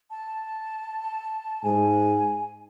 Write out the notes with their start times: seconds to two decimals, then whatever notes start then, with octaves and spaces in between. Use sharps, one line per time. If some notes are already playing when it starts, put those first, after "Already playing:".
0.11 A5
1.63 G#2 G#5